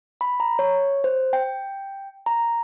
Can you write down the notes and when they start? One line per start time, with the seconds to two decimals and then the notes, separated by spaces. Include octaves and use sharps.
0.21 B5
0.40 A#5
0.59 C#5
1.04 C5
1.33 G5
2.26 A#5